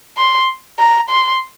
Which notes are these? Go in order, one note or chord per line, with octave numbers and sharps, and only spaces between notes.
C6
A#5
C6